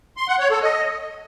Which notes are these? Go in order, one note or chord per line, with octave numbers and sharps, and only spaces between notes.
C6
F#5
C#5
A4
D#5